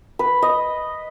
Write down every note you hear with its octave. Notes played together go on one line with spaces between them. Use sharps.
B4
D#5